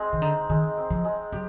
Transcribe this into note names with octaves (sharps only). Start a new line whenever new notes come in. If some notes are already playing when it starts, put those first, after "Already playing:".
Already playing: G#3 C4
D#3
D3 D#4
D#3 G#3
C4
F3
G#3
F#3 G4